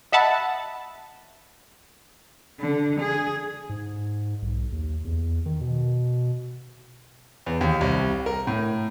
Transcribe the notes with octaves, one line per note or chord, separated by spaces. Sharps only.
D#5 E5 F#5 A5 B5
D3
G#4
G#2
B1
D#2
E2
D#3
B2
E2
D#2
C2
A#4
A2